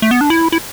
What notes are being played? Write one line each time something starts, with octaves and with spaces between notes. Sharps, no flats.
A3
B3
D4
E4
E4